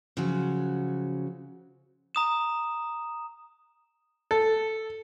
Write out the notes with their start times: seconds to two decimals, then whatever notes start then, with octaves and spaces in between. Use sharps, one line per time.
0.17 C#3 F3 F#3 F#4
2.15 A#5 D#6 E7
4.31 A4